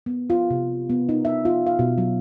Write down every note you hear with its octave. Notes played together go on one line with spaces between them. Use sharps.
B3
F4
C3
B3
D#4
E5
F4
F5
B2
F#3